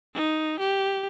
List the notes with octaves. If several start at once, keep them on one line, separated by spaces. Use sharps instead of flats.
D#4
G4